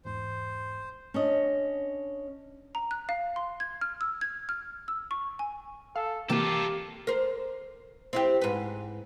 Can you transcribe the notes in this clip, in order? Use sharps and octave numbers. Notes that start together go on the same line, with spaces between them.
E2 G#2 C5
C#4 D4 D#5
A#5
F#6
F5
C6
G#6
F6
E6
G#6
F6
E6
C#6
G#5
A4 F5
C3 E3 A#3 F4 G4 A4 A#4
A#4 C5
C4 E4 G4
G#2 B4